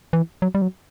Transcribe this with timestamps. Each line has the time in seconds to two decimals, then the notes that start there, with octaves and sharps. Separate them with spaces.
0.13 E3
0.42 F#3
0.55 G3
0.62 F#3